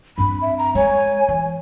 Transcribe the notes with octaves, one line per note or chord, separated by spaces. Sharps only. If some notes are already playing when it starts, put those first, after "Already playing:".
G2 C4 B5
E5
A#5
G#3 C#5 G#5
E3